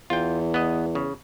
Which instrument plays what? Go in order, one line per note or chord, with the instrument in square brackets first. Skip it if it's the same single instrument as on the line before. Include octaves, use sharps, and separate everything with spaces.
[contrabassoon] E2 [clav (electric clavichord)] F4 G5
[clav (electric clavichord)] B3 D#5
C#3